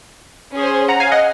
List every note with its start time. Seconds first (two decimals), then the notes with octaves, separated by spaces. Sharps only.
0.55 C#4 G#4 C5
0.88 F#5 A#5
1.00 F5 G#5
1.12 D#5 F#5